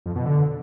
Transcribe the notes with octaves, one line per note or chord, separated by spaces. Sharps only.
F2
B2
D3